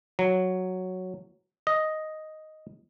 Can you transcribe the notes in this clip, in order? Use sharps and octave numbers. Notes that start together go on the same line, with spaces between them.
F#3
D#5